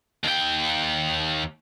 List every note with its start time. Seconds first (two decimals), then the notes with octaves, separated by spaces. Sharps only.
0.24 D#2 G5